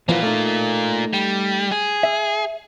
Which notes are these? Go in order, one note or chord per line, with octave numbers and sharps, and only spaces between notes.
E3 F3 A#3 B3 F4
A3 D#4
G3
G#4
E5